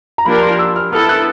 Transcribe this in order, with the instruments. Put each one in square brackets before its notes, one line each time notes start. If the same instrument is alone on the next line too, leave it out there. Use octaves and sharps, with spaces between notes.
[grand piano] A#5
[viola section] F3 A#3 D4 G4 A#4 [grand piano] B5
[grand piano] C6
E6
F6
[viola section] B3 E4 A4 [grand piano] F6
[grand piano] F#6